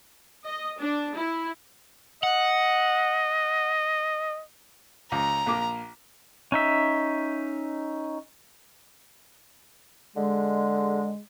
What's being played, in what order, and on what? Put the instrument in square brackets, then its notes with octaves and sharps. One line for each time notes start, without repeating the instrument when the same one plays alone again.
[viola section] D#5
D4
E4
[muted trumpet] D#5 [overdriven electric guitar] F#5
[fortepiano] C#2 [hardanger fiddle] A#5
[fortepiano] A#1 A#3 D6
[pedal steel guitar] C#4 D#4 E5
[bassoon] D3 [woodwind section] G#3